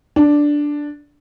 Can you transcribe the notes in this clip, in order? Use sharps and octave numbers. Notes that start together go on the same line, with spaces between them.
D4